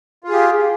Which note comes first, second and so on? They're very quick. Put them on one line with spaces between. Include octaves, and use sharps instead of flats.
F4 G#4 G4